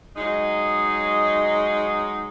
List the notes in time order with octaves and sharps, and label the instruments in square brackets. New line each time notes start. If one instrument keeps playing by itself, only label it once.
[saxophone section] F#3 G#3 D#4